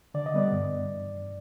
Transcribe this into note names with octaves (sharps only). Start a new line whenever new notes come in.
D3 D5
D#5
G3 B3 D5
G2